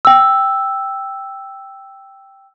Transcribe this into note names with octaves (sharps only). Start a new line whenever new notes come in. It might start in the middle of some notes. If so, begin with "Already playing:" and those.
G5 E6